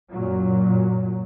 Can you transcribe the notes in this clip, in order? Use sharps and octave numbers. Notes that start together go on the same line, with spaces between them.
F#2 A#2 F#3